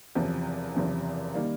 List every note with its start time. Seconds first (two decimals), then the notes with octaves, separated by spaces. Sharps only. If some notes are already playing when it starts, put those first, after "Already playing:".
0.15 F#1 E2 C3 F3
0.75 F#1 E2 C3 F3
1.34 D#3 G3 A#3